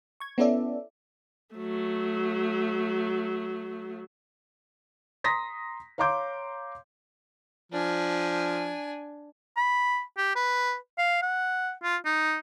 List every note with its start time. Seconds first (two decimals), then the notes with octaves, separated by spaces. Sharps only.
0.20 C#6 G#6
0.38 B3 C#4 E4 A4 D5 E5
1.55 F#3 A3
5.24 A#5 C6 D#6 A#6 B6
5.98 C#5 F5 A#5 C6 D6 G6
7.72 F3 D4 G#5
9.57 B5
10.17 G4
10.36 B4
10.98 F5
11.22 F#5
11.83 F4
12.05 D#4